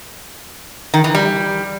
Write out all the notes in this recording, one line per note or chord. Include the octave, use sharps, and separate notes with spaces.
D#3
E3
G3